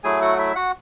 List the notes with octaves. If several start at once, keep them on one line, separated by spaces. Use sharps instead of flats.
F#3 A3 E4 G#4 G#5
F#4 F#5
E4 E5
F#4 F#5